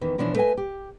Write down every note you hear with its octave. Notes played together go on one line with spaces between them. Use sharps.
E2 D#3 E3
B2 E3 F3 C#4 D4
A3 B4 D#5 G#5
G4